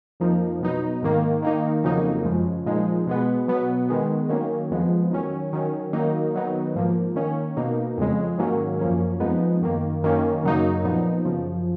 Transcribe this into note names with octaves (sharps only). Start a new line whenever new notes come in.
F2 F3 A#3 D#4
B2 F#3 B3 D#4
G#2 D#3 A#3
D#3 A#3 D#4
F2 C#3 F#3 A#3 D#4
F#2 C#3 F3 G#3
A#2 F3 G#3 D#4
B2 G#3 B3
B2 F#3 B3
D#3 G#3 B3
D#3 F#3 A#3 C#4
F2 F3 G#3 B3
D#3 F#3 C#4
D#3 F#3 C#4
D#3 F#3 A#3 D#4
D#3 F#3 B3 D#4
G#2 F3 A#3
D#3 A#3 C#4
B2 A#3 D#4
F2 C#3 G#3
G#2 D#3 F#3 A#3 C#4
F#2 F3 A#3 C#4
F2 F3 G#3 B3 D#4
F#2 D#3 A#3
F#2 D#3 A#3 C#4
F#2 C#3 F#3 A#3 D#4
A#2 F3 B3 D#4
F#2 C#3 F3